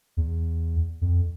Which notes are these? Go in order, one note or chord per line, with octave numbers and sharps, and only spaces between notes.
E2
F2